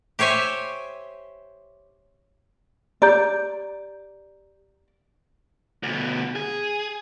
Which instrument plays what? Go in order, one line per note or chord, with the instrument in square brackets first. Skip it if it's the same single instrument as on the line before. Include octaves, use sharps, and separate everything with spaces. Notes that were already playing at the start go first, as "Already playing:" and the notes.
[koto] G4 C5 C#5 E5 G#5
[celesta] G4 A#5 G6 [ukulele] D5
[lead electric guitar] D2 B2
G#4